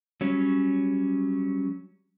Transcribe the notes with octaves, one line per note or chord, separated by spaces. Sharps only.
F#3 G3 C#4